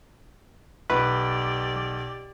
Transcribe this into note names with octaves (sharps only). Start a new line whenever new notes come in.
B1 G4 B4 D5